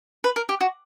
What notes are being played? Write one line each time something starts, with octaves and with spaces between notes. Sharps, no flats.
B4
A#4
G4
F#4